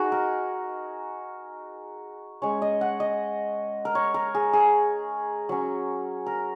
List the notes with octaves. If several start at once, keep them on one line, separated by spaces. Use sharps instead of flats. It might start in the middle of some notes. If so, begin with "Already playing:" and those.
Already playing: D#4 F#4 G#4
A#4
G#3 C#4 C#5
D#5
F#5
D#5
A#4
C#5
A#4
G#4
G#4
F#3 C#4
A#4